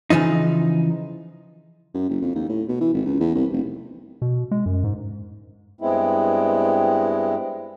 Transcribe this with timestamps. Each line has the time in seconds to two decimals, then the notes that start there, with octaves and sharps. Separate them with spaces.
0.10 C#3 E3 F3 D#4
1.94 F#2
2.09 F#1
2.21 F2
2.35 D#2
2.49 A2
2.68 B2
2.81 E3
2.94 G#1
3.06 C#2
3.20 E2
3.35 C2
3.53 F1
4.22 B2
4.51 G#3
4.66 F#2
4.84 G#2
5.81 G2 G#3 B3 C4 E4